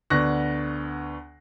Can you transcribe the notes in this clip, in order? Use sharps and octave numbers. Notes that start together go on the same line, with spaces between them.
D2 B3 D4 C#6 F#6 A#6